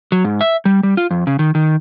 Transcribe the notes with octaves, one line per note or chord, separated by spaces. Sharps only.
F#3
G#2
E5
G3
G3
F4
F2
C#3
D#3
D#3